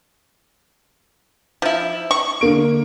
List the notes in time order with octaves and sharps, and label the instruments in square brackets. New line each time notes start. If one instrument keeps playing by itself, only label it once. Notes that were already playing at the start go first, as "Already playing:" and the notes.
[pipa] F3 E4
C#6
[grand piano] D3 A#3 D7